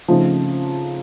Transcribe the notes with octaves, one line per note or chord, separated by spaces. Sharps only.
C#3 F3 A3 C4 D#4